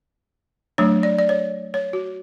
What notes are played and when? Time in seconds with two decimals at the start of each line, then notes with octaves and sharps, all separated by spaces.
0.78 F#3 A3 D4 C#5
1.03 D5
1.19 D5
1.29 C#5
1.74 C#5
1.93 F#4